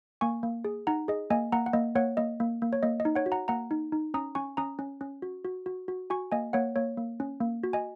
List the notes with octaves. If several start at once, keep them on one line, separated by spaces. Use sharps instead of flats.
A#3 G#5 C#6
A#3
G#4
D#4 F#5 A#5
G#4 D#5
A#3 D#5 G#5
A#3 F#5 A#5
F#5
A#3 D#5
A#3 C#5 F#5
A#3 D#5
A#3
A#3
C#5
A#3 D#5
D#5
D#4
C#5 F#5
F#4
F#5 A#5
A#3 F#5 A#5
D#4
D#4
C#4 A#5 D#6
C#4 G#5 C#6
C#4 A#5 D#6
C#4
C#4
F#4
F#4
F#4
F#4
F#4 G#5 C#6
A#3 D#5 G#5
A#3 C#5 F#5
A#3 C#5
A#3
C#4
A#3
F#4
D#5 G#5